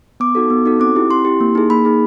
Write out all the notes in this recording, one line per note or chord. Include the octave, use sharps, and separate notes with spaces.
B3 D6
D#4 F#4 A4
B3
D#4 F#4 A4
C4 D6
E4 G4
C4 C6
E4 G4
A#3
D#4 G#4
A#3 B5
D#4 G#4